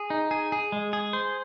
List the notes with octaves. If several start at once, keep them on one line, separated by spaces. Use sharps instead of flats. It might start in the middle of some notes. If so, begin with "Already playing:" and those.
Already playing: G#4
D#4
G#4
G#4
G#3
G#4
C5